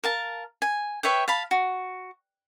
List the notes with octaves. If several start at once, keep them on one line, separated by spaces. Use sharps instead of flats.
A#4 F5 A5
G#5
B4 C#5 E5 G5
F5 A5 B5
F#4